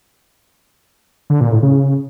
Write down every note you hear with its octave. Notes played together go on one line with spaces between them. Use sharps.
D3
A#2
A2
C#3